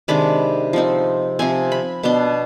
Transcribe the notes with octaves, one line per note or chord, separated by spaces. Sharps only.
C3 D#3 G#3 D4 B5
F3 C4 D#4
C3 F3 C4 G#5
B5
B2 B3 D4 C6